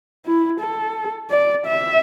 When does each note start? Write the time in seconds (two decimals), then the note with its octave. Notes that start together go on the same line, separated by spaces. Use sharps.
0.26 E4
0.60 A4
1.30 D5
1.66 E5